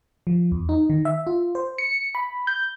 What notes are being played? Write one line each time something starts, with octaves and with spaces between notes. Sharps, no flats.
F3
E2
D#4
D#3
E5
F4
C5
C#7
B5
G6